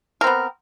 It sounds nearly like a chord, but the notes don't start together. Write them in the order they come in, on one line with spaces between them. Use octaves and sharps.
A#4 C4 B3